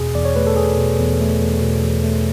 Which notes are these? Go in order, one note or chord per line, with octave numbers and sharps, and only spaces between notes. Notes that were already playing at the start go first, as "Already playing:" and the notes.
Already playing: E2 B2 G#4
E2 D5
C#5
A3 B4
A4
E2 G#4
B2
E2
A3
E2
B2
E2
A3